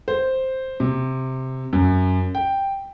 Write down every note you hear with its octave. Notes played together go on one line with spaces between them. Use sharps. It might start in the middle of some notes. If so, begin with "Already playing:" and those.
C5
C3
F#2
G5